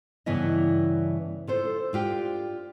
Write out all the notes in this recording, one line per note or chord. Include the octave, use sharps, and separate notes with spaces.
G2 C#3 E3 B3 E4 D#5
F4 A4 C5
D4 F4 G4